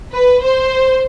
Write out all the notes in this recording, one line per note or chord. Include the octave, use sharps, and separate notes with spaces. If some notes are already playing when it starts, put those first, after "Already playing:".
B4
C5